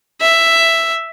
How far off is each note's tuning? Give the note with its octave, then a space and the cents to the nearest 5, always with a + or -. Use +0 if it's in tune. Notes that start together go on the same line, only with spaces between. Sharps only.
E5 +5